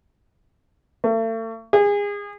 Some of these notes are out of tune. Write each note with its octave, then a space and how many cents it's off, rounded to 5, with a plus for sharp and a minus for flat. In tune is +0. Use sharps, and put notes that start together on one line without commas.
A3 +40
G#4 -30